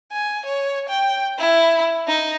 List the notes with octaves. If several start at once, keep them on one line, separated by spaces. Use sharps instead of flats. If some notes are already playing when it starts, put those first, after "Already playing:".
G#5
C#5
G5
E4
D#4